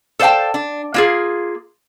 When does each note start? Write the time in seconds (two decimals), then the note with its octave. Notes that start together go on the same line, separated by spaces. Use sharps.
0.19 A4 C5 D5 F5 G5 A5
0.54 D4
0.94 A#3 F4 G#4